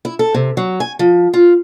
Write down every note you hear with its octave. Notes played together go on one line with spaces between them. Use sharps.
E4
A4
C3
F#3
G#5
F3
F4